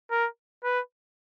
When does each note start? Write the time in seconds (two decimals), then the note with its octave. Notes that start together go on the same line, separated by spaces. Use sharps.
0.11 A#4
0.64 B4